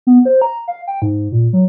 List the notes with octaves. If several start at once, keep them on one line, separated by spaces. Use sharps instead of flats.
B3
C5
A#5
F5
G5
G#2
A#2
F#3